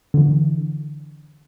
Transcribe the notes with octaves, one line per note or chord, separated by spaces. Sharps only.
D3 E3